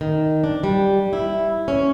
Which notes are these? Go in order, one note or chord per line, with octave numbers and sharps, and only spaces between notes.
D#3
D4
G3
E4
C#4